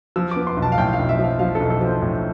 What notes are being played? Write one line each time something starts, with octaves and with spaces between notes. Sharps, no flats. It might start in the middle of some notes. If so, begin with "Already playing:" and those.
F3 E6
D6
B3
C6
B1
A5
F5
A2 G5
F5
B1
E5
F3
F5
F3 F5
A4
B1
A4
F3 C5
A2